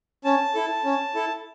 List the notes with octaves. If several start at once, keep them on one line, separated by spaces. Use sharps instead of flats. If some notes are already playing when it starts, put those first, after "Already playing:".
C#4 A5
E4 A4
C#4
E4 A4